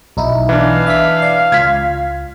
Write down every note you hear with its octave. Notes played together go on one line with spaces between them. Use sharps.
B1 D#4 E4
E3 D4 F5
E5 B6
D5
C#2 F4 G#6 B6